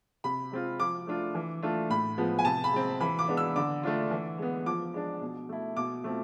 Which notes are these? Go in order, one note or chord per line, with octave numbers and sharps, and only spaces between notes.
C3 B5
G#3 C4 F4
F3 D6
A3 D4 F4
E3
A3 D4 F4
A2 B5
F3 G#3 B3
G#5
C3 A5
B5
G#3 C4
E3 B5
D6
G#3 B3 D4
E6
D3 D6
A3 D4 F4
E3
G#3 B3
F3 D6
G#3 D4
B2
A3 E4
B2 D6
A3 C4 F4